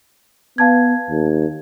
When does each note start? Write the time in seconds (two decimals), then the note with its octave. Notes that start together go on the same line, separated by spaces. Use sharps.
0.58 B3 F5 A5 G#6
1.10 D#2